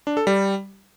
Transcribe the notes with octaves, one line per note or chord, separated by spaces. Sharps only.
D4
A4
G3